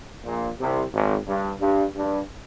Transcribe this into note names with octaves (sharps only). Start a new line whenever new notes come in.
A#1 A#2
C2 C3
G#1 G#2
G2
G2
G2